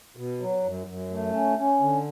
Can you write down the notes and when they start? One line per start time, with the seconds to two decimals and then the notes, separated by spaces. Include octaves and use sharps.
0.17 B2
0.40 F#3
0.64 F#2
0.87 F#2
1.11 A3
1.34 C#4
1.57 C#4
1.80 D3